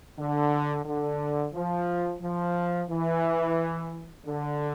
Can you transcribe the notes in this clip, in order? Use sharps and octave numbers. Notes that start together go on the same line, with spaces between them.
D3
D3
F3
F3
E3
D3